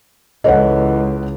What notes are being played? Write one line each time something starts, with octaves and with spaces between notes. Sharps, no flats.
C#2 E3 A4 C#5 D#5 F#5